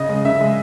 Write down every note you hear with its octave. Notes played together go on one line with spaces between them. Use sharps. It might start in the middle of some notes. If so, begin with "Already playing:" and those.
Already playing: C#3 D#5
G#3
C#3 E5
G#3